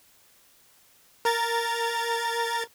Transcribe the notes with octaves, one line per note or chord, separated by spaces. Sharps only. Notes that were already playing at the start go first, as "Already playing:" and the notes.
A#4 A#5 A6